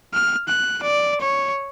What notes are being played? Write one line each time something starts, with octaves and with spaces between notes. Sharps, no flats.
F6
F#6
D5
C#5